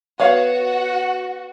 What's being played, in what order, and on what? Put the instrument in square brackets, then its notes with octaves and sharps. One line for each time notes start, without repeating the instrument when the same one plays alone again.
[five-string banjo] B3 C#5 F5 [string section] F#4